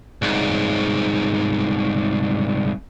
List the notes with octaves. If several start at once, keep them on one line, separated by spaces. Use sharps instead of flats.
C2 G#2